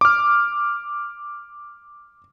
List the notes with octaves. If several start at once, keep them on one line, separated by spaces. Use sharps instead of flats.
D6 F6